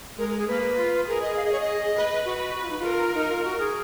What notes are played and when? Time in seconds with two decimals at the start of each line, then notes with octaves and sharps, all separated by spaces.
0.18 G#3 A#4
0.29 A#4
0.38 G#4
0.48 A#3 B4
0.78 F4
1.07 G#4 A#4
1.21 D#5
1.36 F5
1.45 D#5
1.52 C#5
1.60 D#5
1.96 B4
2.25 F#4
2.55 F#4
2.62 F4
2.70 D#4
2.78 F4
2.85 A#4
3.14 D#4
3.29 F4
3.44 F#4
3.59 G#4